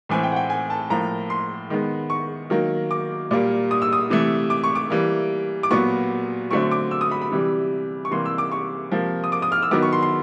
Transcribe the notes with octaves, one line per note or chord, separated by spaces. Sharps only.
A2 E3 A3 C4 G#5
G5
F#5
G5
G#5
A5
A2 F3 A#3 A#5
C6
D#3 G#3 B3
C#6
D#3 F#3 A#3
D6
A#2 G3 A#3
D#6
E6
D#6
C3 E3 A3
D6
C#6
D6
E3 G3 A#3
D6
A#2 F#3 B3 C#6
D3 F#3 A3 C4 C#6
D6
E6
D#6
B5
B5
C3 E3 G3
C#6
C3 E3 G3 A#3 C6
E6
D6
C#6
C3 F3 A#3
D#6
D6
D#6
F6
E6
D#3 F#3 B3 D6
C#6
C6
C6